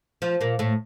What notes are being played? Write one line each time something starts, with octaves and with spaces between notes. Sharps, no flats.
F3 F4
A#2 A#3
A2 A3